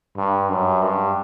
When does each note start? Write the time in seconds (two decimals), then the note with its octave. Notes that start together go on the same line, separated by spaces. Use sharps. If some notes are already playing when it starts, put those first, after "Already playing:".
0.17 G2
0.50 F#2
0.82 G2